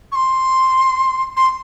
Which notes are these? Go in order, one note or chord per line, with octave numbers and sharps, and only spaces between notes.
C#6
C6
C6